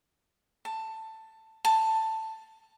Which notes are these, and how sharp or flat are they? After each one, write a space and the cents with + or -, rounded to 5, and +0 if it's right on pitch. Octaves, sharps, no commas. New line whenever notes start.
A5 +15
A5 +10